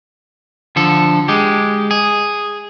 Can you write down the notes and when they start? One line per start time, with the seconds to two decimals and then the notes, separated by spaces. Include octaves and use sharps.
0.76 D3 F3 A4
1.28 G#3 G4
1.91 G#4